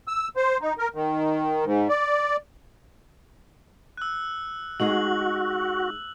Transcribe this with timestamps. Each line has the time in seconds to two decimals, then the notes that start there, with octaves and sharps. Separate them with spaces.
0.08 E6
0.36 C5
0.61 D#4
0.78 A#4
0.95 D#3
1.65 G#2
1.89 D5
3.97 E6 F#6
4.80 G#3 D#4 F#4 G#4 F#7